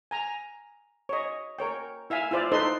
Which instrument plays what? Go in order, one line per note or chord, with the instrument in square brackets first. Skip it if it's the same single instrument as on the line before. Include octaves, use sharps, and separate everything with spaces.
[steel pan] G#5 A#5
C#5 D#5
A#4 C#5 G5
E4 E5 F5 G#5
E4 F4 C5 D5 F5
D#4 A4 B4 C5 D#5 C6